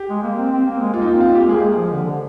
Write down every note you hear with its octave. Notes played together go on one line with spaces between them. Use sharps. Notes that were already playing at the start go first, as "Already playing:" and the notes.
Already playing: G4
G#3
A#3
C4
C4
A#3
G#3
A#3 F4
D#4
F4
C4
F4
A#3 G4
G#3
G#4
A#3
G#3
F3
D3
D3